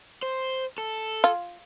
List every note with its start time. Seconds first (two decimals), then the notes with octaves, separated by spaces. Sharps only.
0.23 C5
0.78 A4
1.24 F4